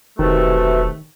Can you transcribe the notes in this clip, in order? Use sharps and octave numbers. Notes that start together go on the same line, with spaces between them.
E1 C3 D#3 A3 F#4 B4